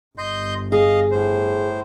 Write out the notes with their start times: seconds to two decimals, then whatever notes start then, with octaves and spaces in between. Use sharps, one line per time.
0.18 G1 D#5 C6 G6
0.72 G#4 D#5 F5
1.11 A2 C5